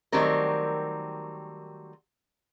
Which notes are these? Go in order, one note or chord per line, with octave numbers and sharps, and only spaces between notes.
D#3 F#3 G3 A3 C4 A#4